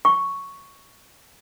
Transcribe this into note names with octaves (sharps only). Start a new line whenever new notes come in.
C#6